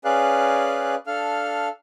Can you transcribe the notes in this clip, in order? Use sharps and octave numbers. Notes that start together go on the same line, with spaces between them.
C#4 G#4 B4 D5 F5 F#6
D4 A4 F5 F6